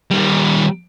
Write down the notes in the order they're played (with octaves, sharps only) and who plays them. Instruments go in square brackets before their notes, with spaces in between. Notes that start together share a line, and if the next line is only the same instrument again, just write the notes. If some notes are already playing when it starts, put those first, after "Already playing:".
[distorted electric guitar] D#3 G3